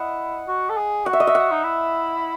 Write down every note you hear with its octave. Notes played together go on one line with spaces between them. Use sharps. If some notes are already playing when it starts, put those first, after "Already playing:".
Already playing: E4 D#5 F#5
F#4
A4
G#4
F#4 F#5
E5
D#5
E5
F#5
D#4
E4